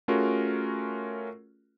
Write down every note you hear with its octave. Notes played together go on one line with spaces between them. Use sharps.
A3 C#4 F4 F#4 G#4 A#4